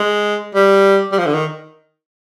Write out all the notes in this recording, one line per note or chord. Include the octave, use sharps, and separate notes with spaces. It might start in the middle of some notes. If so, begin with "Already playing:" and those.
Already playing: G#3
G3
G3
F3
D3
D#3